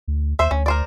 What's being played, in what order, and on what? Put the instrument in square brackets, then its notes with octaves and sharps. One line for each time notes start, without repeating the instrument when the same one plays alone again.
[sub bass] D2
[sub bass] D#2 [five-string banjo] C5 E5
[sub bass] D2 [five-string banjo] C#4
[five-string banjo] A#4 C5 D5